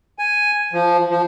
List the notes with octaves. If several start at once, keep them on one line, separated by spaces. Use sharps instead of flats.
G#5
F3
F3